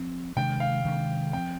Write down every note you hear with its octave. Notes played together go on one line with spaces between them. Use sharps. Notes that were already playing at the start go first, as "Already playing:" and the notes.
Already playing: F3 C4
C3 D#3 G#3 D4 G5
F5
C3 D#3 G#3 D4
F3 C4 G5